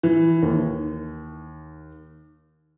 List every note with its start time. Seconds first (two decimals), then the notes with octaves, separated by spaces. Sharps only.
0.03 E3
0.43 D#2